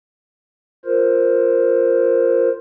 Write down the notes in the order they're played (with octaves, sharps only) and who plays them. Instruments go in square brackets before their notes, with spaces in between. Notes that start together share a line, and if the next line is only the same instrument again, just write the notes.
[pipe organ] F4 A#4 C5